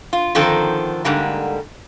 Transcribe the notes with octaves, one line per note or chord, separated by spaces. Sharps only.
F4
D3 D#3 F3 C4 D#4 A4
G#2 D3 G3 A#3